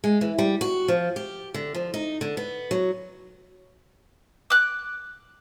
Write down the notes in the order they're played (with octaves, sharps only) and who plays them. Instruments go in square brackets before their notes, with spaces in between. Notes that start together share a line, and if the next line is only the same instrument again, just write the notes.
[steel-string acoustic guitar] G#3
E3
G3
F#4
F3
G4
D3
F3
D#4
D3
B3
F#3
[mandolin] D6 F#6